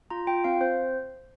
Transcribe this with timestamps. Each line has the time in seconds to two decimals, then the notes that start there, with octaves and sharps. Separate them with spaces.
0.10 F4 A#5
0.27 F4 G5
0.44 C4 F5
0.61 C4 C5